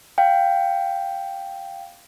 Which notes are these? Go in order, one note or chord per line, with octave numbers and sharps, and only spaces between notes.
F5 G5